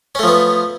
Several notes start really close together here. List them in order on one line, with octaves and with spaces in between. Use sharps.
C#4 A3 F3 B3